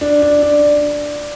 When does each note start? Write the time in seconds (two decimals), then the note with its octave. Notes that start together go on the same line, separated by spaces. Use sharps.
0.01 D4
0.22 D4
0.42 D4